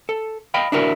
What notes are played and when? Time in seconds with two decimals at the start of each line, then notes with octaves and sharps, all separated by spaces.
0.09 A4
0.54 D#5 F5 G5 B5
0.72 D4 E4 F#4 A#4